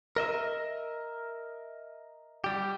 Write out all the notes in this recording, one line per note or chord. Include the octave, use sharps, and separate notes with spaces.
A#4 D#5 E5
G3 G4